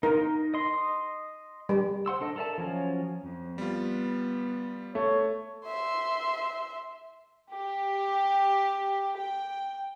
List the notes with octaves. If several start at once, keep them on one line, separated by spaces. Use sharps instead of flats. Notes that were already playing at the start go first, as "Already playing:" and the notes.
D#4 A#4
D#5 C6
G3
C5 F#5 C6 E6
D4 A4 D#5
A4 A#4 D5 E5 A5
F3 F#3 C#4 F4
F2
G3 B3 F4
A3 C#5
E5 C6
G4
G5